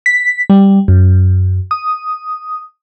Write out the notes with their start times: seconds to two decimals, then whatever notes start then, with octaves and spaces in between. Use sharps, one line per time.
0.06 B6
0.50 G3
0.88 F#2
1.71 D#6